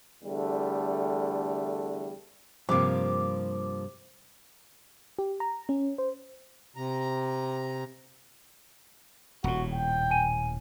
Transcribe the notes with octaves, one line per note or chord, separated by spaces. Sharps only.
E2 D3 G3 A3
G2 C3 F3 A#3 D6
G4
A#5
C#4
C5
C3 A#5
D#1 A2 F#4
G5
G#5 D#7